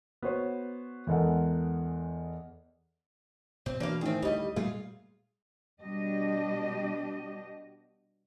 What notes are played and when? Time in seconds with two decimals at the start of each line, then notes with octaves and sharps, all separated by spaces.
0.22 B3 F#4 C5 C#5
1.07 E2 E3 G#3 A4 A#4 F#5
3.66 B2 C4
3.80 B2 E3 A#3 D4 F5
4.01 A2 D#3 C4 G#4
4.22 D2 G3 D#5
4.56 A#2 G3 A3 F4 G#4
5.80 B2 G3 D4 G4 D#5